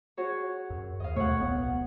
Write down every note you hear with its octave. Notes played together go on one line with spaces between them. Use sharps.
F#4 G#4 C#5
F#2
D#2 D#5 F5
D#2 B2 A3 C#5 F#5
D1 B1 B3